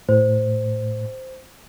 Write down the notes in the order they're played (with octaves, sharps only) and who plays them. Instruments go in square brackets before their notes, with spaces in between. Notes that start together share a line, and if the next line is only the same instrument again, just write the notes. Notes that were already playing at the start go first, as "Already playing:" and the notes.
[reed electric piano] A2 [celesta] C5